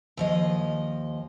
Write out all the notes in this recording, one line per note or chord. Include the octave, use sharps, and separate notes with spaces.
D#2 F3 D#5